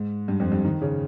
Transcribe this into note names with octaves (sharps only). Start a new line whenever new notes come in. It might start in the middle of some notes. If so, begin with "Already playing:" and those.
Already playing: G#2
G2
F2
G2
D#3
C#3